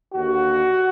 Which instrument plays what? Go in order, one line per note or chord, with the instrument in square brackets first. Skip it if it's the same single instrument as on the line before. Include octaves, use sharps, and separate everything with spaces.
[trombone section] D#2 D3 F#4